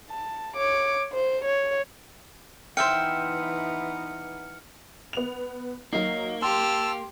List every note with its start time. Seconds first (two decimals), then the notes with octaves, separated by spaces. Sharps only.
0.10 A5
0.56 C#5 D6
1.13 C5
1.44 C#5
2.77 E3 B3 D#4 C5 E5 G5 F6 C#7
5.13 B3 F7
5.93 F#3 A#3 D#4
6.42 G4 A5 C6 E6 F6